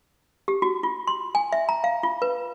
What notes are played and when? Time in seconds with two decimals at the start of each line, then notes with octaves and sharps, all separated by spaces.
0.48 G4
0.62 F#4
0.83 F4
1.07 C6
1.35 G#5
1.52 E5
1.69 A#5
1.84 F5
2.03 F4
2.22 B4